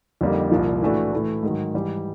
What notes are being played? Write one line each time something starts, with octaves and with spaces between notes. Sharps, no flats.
F2 D3 G3 A#3 D#4
C2 A#2 F3
A2 E3 A3 D4 F#4
A2 E3 A3
G#2 D#3 F#3
G#2 E3 G3